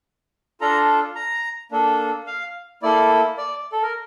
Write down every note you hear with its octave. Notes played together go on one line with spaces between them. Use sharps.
D4 F4 A4 A#5
A#5
A#3 D4 A4
F5
A#3 E4 A4 D5
D5
A4
A#4